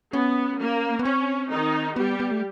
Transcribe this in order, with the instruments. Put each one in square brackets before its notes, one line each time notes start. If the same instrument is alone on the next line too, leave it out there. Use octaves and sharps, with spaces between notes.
[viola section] B3 [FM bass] C#4
[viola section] A#3
[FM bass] B3
[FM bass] C4 [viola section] C#4
[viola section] D#3 D#4
[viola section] G3 G4 [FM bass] B3
[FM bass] B3
A3